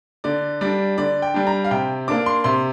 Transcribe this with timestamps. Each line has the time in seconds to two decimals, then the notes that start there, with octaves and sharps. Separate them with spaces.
0.24 D3 D5
0.61 G3 D4 D5
0.98 D3 D5
1.22 G5
1.34 G3 D4
1.47 A#5
1.64 F5
1.71 C3 G5
2.08 A#3 D4 D6
2.26 C6
2.44 C3 C6